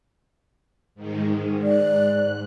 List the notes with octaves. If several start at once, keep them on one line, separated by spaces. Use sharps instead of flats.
G#2 D#3 G#3
G#2 D5 F#6